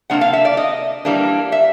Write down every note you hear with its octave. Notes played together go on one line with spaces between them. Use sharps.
C3 F3 A#3 D4 F#5
F5
E5
D5
D#5
E3 G3 A#3 D4
E5